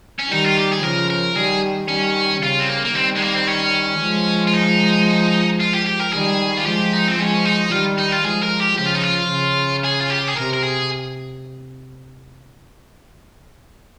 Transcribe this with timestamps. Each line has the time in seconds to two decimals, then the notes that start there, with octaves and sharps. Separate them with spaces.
0.19 C#4
0.30 D#3 G3 D#4
0.44 F4
0.56 G4
0.71 G#4
0.83 C#3 F3 A#4
1.10 A#4
1.36 D#3 G3 G#4
1.89 D#3 G3 C#4
2.42 C#3 F4
2.60 C4
2.69 A#3
2.85 A#3
2.94 D#3 G3 C4
3.16 G#3
3.22 A#3
3.34 C4
3.47 C#4
4.00 F3 G#3
4.47 F4
4.54 D#4
5.60 F4
5.73 G4
5.86 G4
6.00 A#4
6.13 D#3 G3 G#4
6.57 F4
6.66 F3 G#3 G4
6.93 D#4
7.08 C4
7.18 F3 G#3 C#4
7.45 D#4
7.71 D#3 G3 F4
7.98 D#4
8.12 F4
8.25 F3 G#3 G#4
8.43 A#4
8.60 G4
8.78 C#3 F3 G4
8.86 F4
8.95 D#4
9.03 F4
9.31 C#3
9.84 G#4
10.00 F4
10.10 G4
10.28 G#4
10.36 C3 A#4
10.54 A#4
10.63 G#4